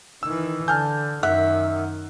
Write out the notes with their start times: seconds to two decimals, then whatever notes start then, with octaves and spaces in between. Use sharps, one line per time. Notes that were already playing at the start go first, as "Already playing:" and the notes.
0.23 D#3 E3 E6
0.68 D3 G#5 A5 F6 G6
1.23 F#2 D#3 E5 F#5 E6 F#6